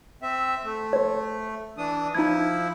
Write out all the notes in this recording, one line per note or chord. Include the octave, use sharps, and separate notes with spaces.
C4 E5
A3
C5 C#5
E3 D4 D#6
F3 D#4 E4 G#6